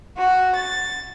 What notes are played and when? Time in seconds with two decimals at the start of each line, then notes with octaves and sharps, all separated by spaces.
0.17 F#4
0.55 A6